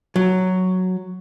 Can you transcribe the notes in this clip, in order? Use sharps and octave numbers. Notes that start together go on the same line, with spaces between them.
F#3